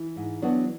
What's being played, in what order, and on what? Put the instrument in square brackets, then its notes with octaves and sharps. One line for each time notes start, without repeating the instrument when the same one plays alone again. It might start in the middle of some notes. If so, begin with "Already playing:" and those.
Already playing: [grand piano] E3
[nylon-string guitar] G#2
F#3 B3 D4 F#4